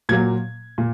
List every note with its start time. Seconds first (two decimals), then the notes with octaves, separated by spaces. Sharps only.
0.09 A#2 F#3 A#3 G#6
0.78 A#2